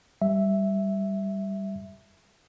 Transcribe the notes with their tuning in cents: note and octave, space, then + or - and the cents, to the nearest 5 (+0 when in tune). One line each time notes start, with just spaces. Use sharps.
G3 +0 E5 +0